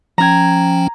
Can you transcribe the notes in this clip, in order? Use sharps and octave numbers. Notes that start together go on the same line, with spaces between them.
F3 C#4 G5 A#5 G#6